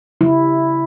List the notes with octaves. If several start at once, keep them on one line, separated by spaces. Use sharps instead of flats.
C#3 G3 E4